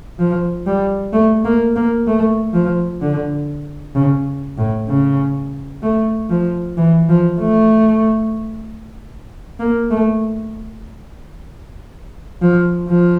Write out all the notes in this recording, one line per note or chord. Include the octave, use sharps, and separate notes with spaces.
F3
G3
A3
A#3
A#3
A3
F3
D3
C#3
A2
C#3
A3
F3
E3
F3
A3
A#3
A3
F3
F3